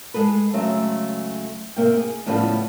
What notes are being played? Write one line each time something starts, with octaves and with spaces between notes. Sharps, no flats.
G#3 G#4 A4 B4
C#3 F#3 G#3 A3 C4
C3 A#3 G5
G#4
A2 C#3 F3 G3 B3